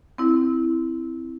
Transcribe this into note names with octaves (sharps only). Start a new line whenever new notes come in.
C4 E4